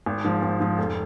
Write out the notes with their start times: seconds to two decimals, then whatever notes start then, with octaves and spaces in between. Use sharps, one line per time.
0.06 G#1
0.24 G#2 F3
0.42 G#1
0.60 G#2 F3
0.78 F1